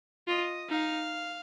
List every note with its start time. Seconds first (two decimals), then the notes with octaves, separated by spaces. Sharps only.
0.28 F4 D#5
0.69 D#4 F5